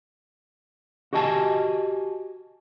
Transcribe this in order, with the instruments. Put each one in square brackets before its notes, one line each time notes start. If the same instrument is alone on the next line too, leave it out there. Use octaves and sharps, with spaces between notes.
[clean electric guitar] F#4 G4 D#5 G#5 A5